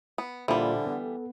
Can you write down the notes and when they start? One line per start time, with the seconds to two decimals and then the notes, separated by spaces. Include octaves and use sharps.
0.18 B3
0.48 A#2 D3 E3 G3 F4 C5 E5 B5
0.86 B3 A4